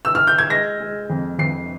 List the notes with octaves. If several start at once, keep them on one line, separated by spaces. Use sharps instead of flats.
E6
F6
G6
G#6
G#3 A#6
G#3
F2
F2 C7